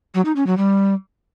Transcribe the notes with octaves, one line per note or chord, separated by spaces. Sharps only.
F#3
D#4
C#4
F#3
G3